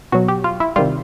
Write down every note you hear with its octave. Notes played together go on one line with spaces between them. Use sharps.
B2 F#3 F#4
G4
F4
E4
C3 D#3 G3 F4